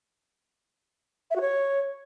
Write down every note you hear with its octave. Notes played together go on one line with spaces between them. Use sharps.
E5
F#4
C#5